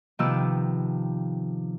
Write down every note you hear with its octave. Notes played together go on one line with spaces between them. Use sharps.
C3 D#3 F3 B3 D6 E6